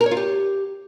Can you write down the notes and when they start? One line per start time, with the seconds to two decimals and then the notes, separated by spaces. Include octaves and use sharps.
0.01 A#4
0.06 C#5
0.11 F4
0.17 G4